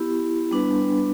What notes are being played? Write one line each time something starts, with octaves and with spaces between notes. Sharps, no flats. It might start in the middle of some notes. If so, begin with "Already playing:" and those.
Already playing: B3 E4 G4
G3 B3 D4 B4